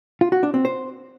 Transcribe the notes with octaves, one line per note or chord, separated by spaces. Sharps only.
F4
F#4
D4
C4
C5